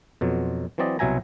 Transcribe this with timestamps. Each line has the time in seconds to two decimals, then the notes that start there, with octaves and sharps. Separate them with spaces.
0.21 F2 B2 F#3
0.78 E3 F#3 C4 D5 D#5
0.99 C2 B2 F#3 E5 G#5 A#5